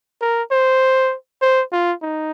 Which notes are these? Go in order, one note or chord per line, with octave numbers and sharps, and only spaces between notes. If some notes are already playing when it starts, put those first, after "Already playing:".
A#4
C5
C5
F4
D#4